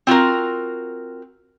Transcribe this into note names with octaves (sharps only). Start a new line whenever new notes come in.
C4 F4 F#4 A#4